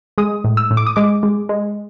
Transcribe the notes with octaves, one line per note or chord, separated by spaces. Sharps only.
G#3 D#6
A2
E6
A2
D6
D#6
G#3 D6
G#3
G#3